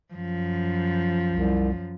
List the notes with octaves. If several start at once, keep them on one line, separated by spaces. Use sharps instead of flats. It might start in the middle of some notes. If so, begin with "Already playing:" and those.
F#2 F3
C2